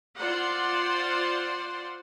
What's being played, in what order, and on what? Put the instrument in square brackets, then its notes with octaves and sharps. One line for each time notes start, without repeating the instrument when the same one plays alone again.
[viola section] F4 C5 D5 F#5 C6